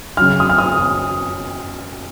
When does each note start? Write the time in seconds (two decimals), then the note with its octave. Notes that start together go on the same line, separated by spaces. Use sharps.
0.17 C#3 F#3 F6
0.40 D#6
0.49 F6
0.58 D#6